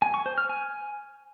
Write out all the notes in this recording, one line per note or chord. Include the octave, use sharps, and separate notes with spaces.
G#5
C#6
C5
F6
G#5